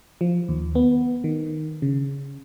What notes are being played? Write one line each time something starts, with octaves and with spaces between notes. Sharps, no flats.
F3
D#2
B3
D#3
C#3